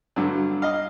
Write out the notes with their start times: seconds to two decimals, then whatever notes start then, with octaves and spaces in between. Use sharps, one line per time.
0.16 G2 D3 F#3
0.62 D#5 F5